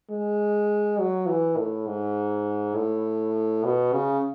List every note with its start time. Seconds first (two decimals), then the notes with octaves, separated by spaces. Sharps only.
0.10 G#3
0.99 F#3
1.28 E3
1.57 A2
1.87 G#2
2.75 A2
3.64 B2
3.93 C#3